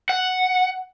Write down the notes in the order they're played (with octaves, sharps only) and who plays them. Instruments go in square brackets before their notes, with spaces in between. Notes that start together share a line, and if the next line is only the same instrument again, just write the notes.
[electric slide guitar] F#5